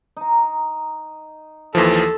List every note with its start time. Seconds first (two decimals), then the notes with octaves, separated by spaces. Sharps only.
0.17 D#4 A#5
1.75 D#2 E3 F3 A4